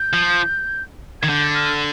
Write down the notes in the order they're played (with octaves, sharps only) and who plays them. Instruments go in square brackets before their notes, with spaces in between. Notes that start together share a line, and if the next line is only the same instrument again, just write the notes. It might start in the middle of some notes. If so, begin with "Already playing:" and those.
Already playing: [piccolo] G6
[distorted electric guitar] F3
[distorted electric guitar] D#3 [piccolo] G#6
[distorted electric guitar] D3 [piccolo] G6
[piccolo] F6